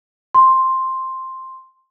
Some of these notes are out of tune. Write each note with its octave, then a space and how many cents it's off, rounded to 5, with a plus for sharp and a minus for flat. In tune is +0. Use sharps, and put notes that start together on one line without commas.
C6 +5